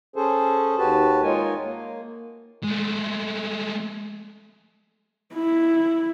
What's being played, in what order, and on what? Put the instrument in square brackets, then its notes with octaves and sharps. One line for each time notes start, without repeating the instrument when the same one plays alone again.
[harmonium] C#4 G#4 A4 C5
D#2 F#4 G4 B4 A5
G#3 D#4 F4 A#4 C#5 G#5
A#3
[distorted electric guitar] G#3 A3
[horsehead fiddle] E4